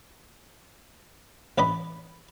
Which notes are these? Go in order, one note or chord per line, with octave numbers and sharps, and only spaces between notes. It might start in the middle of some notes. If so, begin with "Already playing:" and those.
A1 B4 D5 D#5 B5